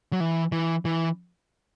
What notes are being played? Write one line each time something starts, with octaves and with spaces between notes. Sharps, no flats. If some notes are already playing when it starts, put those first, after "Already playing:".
F#3
E3
E3
E3